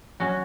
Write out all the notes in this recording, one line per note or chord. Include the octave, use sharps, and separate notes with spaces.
F#3 C#4 F#4